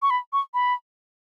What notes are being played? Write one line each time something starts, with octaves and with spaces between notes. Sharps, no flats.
C#6
B5
C#6
B5